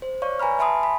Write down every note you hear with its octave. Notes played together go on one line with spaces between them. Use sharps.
C5
C#5 D5 F5 C#6
B4 G#5 A#5 B5 F6
E5 G#5 A5 B5 C6 D#6
B5